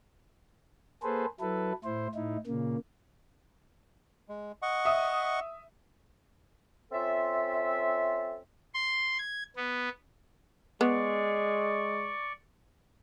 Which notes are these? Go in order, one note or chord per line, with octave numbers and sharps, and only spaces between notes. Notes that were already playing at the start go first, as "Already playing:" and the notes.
A#3 G#4 A4 B4 C5
F#3 E4 A4 B4
A2 E4 C5
A2 D#4 E4
A#2 C#3 A#3
G#3
D#5 F#5 C#6
E5 D#6
C4 C#4 F4 A4 E5
C6
G#6
B3
G#3 B3 D5 C#6